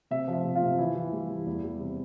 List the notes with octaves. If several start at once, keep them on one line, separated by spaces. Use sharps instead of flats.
C3 E5
F3
E5
C3
F4
C3
E3 E4
E3
G3
E3
E2
G3
C3